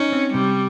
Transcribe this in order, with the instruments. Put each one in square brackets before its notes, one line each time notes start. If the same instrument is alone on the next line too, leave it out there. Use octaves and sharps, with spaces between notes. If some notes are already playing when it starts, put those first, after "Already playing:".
Already playing: [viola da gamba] C#4 [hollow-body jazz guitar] D#4
[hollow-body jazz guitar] C4
[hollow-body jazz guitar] C3 [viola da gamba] G3